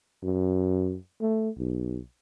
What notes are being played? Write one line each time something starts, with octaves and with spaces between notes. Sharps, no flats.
F#2
A3
B1